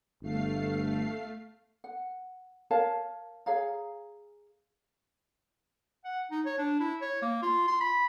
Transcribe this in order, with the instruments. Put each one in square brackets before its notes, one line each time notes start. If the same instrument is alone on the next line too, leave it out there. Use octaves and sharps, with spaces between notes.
[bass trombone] G1 [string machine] A3 F5 C7
[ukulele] F#5
A#4 C#5 F5 A5
G#4 C#5 F5 A#5
[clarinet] F#5
D#4
C#5
D4
E4
C#5
A#3
F4
C6
B5